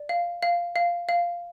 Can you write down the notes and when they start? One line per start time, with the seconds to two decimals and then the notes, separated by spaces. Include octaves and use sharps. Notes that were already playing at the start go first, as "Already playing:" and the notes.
Already playing: D5
0.09 F5
0.43 F5
0.76 F5
1.09 F5